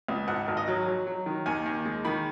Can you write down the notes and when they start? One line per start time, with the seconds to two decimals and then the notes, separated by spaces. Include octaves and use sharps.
0.08 C#2
0.28 G#1 F#5
0.48 G#1
0.57 D#5
0.68 F#3
0.87 F#3
1.07 F#3
1.26 D#3
1.46 D#2 G#5
1.66 D#2
1.85 G#3
2.05 D#3 B5